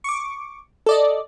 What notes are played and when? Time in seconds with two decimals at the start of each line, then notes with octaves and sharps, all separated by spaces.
0.04 C#6 D6
0.86 A4 D5 D#5